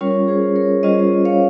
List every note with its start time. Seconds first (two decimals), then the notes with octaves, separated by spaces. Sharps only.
0.01 G3 C#4 F4 A#4 C#5
0.28 G#4 C5
0.56 A#4 C#5
0.83 G3 C#4 F4 C5 D#5
1.25 C#5 F5